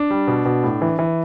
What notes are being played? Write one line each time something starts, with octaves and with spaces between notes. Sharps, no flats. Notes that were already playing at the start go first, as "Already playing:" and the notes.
Already playing: D4
G3
B2
B2
A2
E3
E3